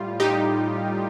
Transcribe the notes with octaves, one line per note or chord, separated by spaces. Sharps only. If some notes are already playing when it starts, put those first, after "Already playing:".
Already playing: A2 G3 F4
D#4 G4